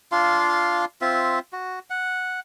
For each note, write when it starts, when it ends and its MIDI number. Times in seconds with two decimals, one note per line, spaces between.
0.12 0.85 62
0.12 0.85 65
0.12 0.85 77
0.12 0.85 84
1.01 1.39 60
1.01 1.39 65
1.01 1.39 76
1.53 1.79 66
1.90 2.40 78